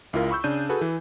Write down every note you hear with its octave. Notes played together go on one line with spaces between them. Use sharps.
C#2 E4 F4 A#4
B5 C#6 E6 G6
C#3 D4 G6 D#7
F#4 G#4 A4 B4
E3